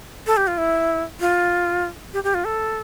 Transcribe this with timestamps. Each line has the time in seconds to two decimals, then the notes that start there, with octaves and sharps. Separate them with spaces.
0.26 A4
0.37 G4
0.47 F4
0.58 E4
1.20 F4
2.13 G4
2.24 G4
2.34 F4
2.45 A4